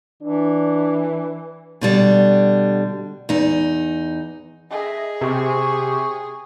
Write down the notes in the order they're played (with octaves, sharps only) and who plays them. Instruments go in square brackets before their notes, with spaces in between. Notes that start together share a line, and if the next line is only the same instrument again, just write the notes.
[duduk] E3 [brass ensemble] D4
[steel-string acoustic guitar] B2 D3 G3
E2 D#4
[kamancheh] G#4 [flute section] D#5 E5
[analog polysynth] C3 [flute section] C#6